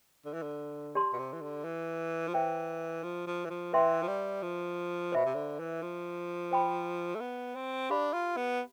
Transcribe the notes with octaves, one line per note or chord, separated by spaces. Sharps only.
D3
E3
D3
G4 D5 A5 C6
B2
C3
E3
D3
E3
F3
E3 C5 E5 G5
F3
F3
E3
F3
E3 B4 E5 G5 C6
F3
G3
F3
B2 C5 E5 B5
C3
D3
E3
F3
C5 G5 B5
A3
B3
C4
D4 G4 D5 F5 B5
F4
B3